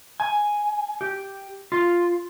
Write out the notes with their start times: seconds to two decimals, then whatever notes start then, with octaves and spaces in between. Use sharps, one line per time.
0.20 G#5
1.01 G4
1.72 F4